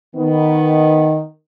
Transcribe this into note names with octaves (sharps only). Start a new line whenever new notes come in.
D#3 B3